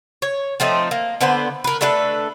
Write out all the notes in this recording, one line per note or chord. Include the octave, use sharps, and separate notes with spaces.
C#5
F3 A3 C4 D#4
A#3
D3 B3 B4 C5
A#4 B4
A3 D4 A4 B4